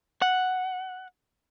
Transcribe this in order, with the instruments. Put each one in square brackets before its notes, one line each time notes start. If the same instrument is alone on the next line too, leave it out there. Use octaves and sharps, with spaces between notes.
[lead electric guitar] F#5